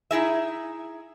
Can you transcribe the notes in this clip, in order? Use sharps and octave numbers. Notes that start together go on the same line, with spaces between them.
D#4 E4 G#4 E5